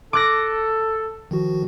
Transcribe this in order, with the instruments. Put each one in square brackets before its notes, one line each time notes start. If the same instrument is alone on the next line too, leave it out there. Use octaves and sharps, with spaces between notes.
[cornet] A4 [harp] D6 F#6 A#6
[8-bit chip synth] D#3 F3 F#4